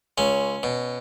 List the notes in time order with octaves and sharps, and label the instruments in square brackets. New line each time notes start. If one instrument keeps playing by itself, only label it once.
[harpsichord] C#2 C#4
B2